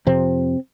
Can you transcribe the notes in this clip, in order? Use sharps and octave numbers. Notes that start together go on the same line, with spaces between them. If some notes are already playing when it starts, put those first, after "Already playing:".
F2 C3 C4